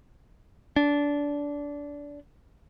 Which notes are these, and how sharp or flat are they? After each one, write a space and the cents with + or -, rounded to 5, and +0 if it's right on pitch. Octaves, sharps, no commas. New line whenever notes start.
D4 -20